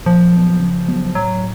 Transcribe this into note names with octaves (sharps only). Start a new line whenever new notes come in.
A#2 F3
F#3 B3
C#3
F#3 B3
A2 F#3